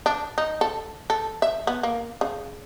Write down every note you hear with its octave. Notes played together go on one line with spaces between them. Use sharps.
D4
D#4
A4
A4
E5
B3
A#3
C#3